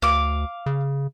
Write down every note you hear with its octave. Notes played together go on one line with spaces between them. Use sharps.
D2 F5 D6
C#3